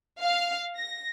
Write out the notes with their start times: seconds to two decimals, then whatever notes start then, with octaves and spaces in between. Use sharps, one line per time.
0.21 F5
0.77 A#6